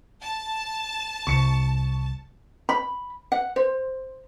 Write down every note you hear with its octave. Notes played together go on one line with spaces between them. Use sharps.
A5
C2 C3 C#6 C#7
B5
F#5
C5